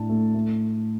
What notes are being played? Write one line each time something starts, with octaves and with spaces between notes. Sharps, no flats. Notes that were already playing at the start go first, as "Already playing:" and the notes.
Already playing: A2 D4 A5
A3
A3